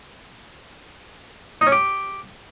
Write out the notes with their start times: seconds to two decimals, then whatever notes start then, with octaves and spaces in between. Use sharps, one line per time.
1.61 D#4
1.67 C#4
1.72 G4